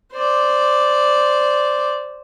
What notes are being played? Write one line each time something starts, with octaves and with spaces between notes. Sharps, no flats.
C5 D5